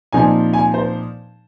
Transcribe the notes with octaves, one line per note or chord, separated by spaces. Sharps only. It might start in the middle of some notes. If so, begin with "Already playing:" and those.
A#2 F3 C4 D#4 G#5
G#5
C5